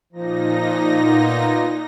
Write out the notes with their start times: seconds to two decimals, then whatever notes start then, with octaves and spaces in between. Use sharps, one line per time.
0.13 A#2 F3 D#4 A#6
1.05 A#3 B3 F4